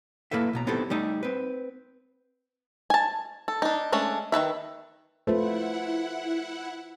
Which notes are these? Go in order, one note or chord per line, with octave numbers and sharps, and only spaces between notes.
A#3 E4 A4 B4 E5
B1 B2 A#5
B3 C4 D#4 E4 G4 A4
G3 A3 D#4 G4
C4 B4
G#5 A5
A4
D4 D#4
G#3 A3 C#4 D4
D#3 E3 B4 E5
A3 E4 F4 B4 C5 F#5